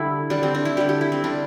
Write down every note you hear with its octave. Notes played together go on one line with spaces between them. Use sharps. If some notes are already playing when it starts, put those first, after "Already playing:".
Already playing: D3 G3 E4
D3 G3 D4
C4
D4
E4
D3 G3 G4
G4
E4
C4
D3 G3 D4